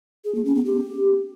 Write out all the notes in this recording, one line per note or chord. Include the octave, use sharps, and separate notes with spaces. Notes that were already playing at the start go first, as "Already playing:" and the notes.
G#4
A#3
C#4
B3
G4